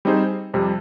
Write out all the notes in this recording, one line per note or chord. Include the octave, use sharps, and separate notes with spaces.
G3 C4 D#4 G#4 C5
F2 C3 G3